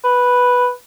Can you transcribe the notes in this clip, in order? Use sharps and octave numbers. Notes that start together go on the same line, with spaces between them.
B4